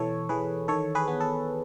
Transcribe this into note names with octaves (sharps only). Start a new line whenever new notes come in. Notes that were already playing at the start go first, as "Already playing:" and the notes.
Already playing: B2 E3 A4 C#5
E3 G#4 B4
D#3 A4 C#5
G#4 B4
B3
A4